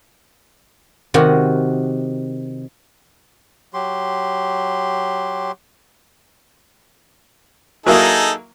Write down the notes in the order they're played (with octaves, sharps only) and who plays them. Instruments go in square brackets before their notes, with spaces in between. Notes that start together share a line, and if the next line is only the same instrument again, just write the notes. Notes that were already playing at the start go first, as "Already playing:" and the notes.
[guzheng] C3 D#3 F#4 F#5
[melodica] F#3 G4 C6
[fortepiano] F#3 A#3 E4 [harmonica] D#4 G#4 A4